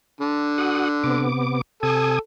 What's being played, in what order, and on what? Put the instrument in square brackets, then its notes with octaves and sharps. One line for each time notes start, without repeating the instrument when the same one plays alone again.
[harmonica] D3
[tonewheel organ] F#4 F#5 D#6
C3 B3 D6
[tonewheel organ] C3 G#5 D#6 [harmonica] A4